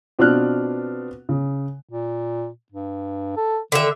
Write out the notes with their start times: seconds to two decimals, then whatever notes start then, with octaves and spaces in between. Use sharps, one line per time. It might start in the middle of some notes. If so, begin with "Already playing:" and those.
0.19 B2 C4 D4 F4 F6 F#6
1.29 C#3
1.90 A#2
2.72 G2
3.36 A4
3.72 D3 D#3 E5